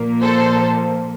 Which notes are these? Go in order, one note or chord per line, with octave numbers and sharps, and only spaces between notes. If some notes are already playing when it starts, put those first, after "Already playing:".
Already playing: A#2 F3 A#3
A4 C5